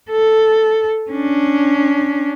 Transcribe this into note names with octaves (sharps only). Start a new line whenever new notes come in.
A4
C#4 D4